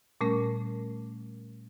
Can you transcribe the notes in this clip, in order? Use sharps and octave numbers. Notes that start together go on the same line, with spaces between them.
A#2 G3 A3 C#4 A#4